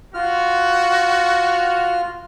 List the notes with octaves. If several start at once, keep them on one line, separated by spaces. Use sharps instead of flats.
F4 F#4 F6